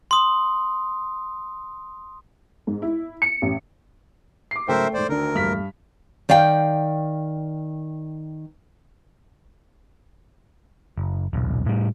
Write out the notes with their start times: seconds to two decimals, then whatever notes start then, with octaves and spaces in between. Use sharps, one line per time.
0.11 C6 D#6
2.67 G#2
2.82 E4
3.22 C#7
3.42 A1
4.51 D6 C7
4.68 G#2 C#3 F#3 A3 A#4 C5 E5 G5
4.94 E1 G#2 C5 D5
5.09 D2 D3 D#3 D4 A#4
5.35 A#1 E2 G2 A3 F6 B6
6.29 D#3 D5 F5 G5
10.98 F#1
11.33 D#1 B1
11.66 A2 G3